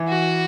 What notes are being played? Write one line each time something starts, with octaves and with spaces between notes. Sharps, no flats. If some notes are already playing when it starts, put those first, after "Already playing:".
Already playing: E3
F#4